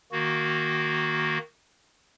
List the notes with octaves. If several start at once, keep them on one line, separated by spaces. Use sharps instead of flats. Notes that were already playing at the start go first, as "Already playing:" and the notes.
D#3 A#3 F#4